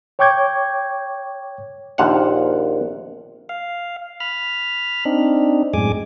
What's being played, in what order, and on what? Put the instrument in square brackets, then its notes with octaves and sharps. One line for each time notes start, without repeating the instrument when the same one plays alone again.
[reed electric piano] C#5 G5 C#6 D6 G6 G#6
[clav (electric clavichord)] A#1 D#2 C5 F5 F#5
[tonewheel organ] F5
B5 F6
C4 D4 D#4
F#2 A2 G#3 G#5 D6